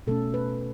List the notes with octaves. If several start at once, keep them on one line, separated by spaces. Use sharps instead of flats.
B2 A3 C#4 A4
B4